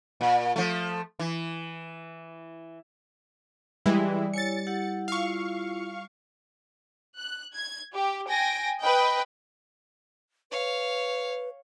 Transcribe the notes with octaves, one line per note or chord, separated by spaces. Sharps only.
A#2
F3 A3
E3
E3 G3 G#3 E4 G5
E4 C#5 G#5 A6 C#7
E4 G4 F#5
E4 F4 F5 C#6
F#6
G#6
G4
G5 G#5 A#6 D7
B4 D#5 G5
B4 C#5 F5